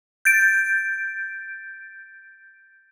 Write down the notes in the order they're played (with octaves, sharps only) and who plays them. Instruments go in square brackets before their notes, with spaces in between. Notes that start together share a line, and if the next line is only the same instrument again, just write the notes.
[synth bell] G6 A6 D7